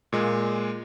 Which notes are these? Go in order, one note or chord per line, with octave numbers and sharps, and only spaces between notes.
A#2 G#3 A#3